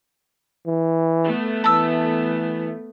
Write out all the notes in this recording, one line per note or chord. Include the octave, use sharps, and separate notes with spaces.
E3
A3 B3
E3 A5 E6